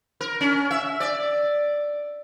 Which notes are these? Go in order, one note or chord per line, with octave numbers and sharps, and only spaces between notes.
A#4
C#4
E5
D5